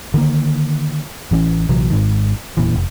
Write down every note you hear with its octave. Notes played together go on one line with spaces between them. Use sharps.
D3 D#3 A#3
A1 E3 G#3 C#4
A#1 C3 E3 F#3
G#1 G#2 D#3
E1 A#2 E3
F1